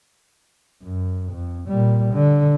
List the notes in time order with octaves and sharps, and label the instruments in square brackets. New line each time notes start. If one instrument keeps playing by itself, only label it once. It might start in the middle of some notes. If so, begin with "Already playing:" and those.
[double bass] F#2
F2
A#2 G3
D3